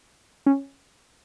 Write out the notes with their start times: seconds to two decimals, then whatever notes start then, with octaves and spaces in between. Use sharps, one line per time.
0.46 C#4